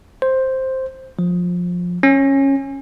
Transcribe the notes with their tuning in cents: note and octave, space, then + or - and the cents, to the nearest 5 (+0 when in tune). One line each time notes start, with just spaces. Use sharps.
C5 +5
F3 +20
C#4 -15